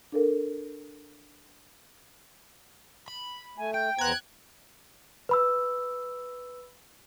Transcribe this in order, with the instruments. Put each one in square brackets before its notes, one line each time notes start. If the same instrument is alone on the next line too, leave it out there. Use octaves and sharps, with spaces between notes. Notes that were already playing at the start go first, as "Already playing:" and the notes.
[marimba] D4 A4 A#4
[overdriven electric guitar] B5
[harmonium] A3 [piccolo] G#5
[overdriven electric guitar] G5 [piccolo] G6
[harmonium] E2 B3 C5 [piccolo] A#5 [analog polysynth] F#6 G#6
[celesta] B4 B5 E6